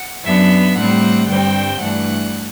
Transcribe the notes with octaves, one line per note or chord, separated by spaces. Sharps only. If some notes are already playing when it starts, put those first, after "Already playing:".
Already playing: F#5
F#2 F#3 B3 D4 E5
A2 G3 C4 F#5
G2 D3 G3 C4 G5
G2 E3 A3 D4 F#5